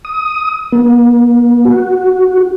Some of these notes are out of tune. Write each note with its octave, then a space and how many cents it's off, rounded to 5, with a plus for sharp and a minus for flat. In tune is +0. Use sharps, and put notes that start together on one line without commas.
D#6 +15
A#3 +45
F#4 +5